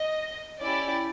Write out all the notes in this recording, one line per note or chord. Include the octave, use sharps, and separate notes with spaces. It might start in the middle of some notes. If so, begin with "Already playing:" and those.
Already playing: D#5
C#4 E4 G4 D5